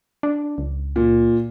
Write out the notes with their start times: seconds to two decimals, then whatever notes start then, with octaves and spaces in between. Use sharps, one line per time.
0.23 D4
0.58 C#2
0.96 A#2